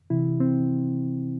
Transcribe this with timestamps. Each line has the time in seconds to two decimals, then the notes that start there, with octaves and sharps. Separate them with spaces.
0.10 C3 E3 E4
0.40 C4